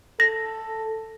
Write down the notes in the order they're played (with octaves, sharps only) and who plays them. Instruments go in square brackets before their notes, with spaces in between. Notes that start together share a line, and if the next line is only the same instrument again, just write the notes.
[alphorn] A4 [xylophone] A#6